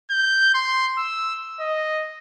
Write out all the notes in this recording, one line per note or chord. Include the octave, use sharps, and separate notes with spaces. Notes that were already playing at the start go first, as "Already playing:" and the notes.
G6
C6
E6
D#5